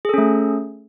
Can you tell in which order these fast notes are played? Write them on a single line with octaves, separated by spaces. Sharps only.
G#4 A4 C#4 A3